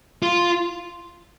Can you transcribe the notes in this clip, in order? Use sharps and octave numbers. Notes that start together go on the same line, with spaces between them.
F4